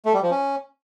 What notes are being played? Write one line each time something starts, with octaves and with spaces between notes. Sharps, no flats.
A3
G3
F3
C#4